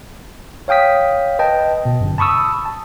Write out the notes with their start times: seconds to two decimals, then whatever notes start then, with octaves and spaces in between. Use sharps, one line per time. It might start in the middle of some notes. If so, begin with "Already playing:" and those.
0.68 C#5 F5 G5 D#6 B6
1.39 B4 D#5 G5 A5
1.85 B2
2.01 G1 F#2
2.18 A5 B5 C#6 D#6 E6
2.66 A5